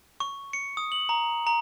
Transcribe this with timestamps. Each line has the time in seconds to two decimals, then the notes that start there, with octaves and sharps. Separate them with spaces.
0.20 C#6
0.53 C#7
0.77 D#6
0.92 F#7
1.09 A#5
1.47 A#5